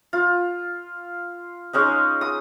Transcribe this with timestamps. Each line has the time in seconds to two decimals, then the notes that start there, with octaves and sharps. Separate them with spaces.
0.13 F4
1.73 G#3 C#4 D#4
2.21 D#6